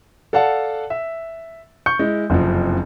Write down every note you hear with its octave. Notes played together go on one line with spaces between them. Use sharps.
A4 D5 F5 F#5 A5
E5
C#6 G6 C#7
G#3 E4
F#1 F2 C3 F3